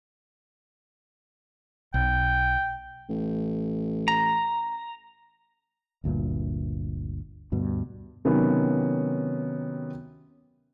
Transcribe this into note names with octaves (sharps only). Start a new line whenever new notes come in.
B1 G5
A1
A#5
G1 D2 G2 A#2
D2 G2 B2
C3 D#3 F#3 B3 C#4